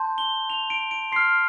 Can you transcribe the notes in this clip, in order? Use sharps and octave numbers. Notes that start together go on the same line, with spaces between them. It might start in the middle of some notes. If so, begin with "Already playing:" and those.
Already playing: A5 C6 G6
G7
F7
D7
D7
C6 F6 C7